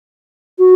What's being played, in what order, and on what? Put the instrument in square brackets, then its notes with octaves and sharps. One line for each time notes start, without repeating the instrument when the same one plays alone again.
[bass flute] F#4